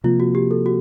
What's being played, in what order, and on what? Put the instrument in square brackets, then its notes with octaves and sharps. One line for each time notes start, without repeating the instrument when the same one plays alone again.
[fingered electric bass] C3 F3 A#3 [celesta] F4
[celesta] F#4
G4
A4
F#4